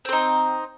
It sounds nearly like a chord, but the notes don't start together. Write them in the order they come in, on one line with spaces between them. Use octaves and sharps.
C4 C5 D#4